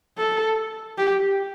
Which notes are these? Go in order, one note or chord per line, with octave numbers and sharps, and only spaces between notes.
A4
G4